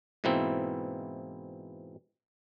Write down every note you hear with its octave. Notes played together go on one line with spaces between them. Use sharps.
G#2 B2 E3 A#3 C4 E4